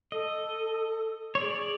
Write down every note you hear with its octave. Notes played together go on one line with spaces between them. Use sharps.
A4 D#5
C#5
G#4 D5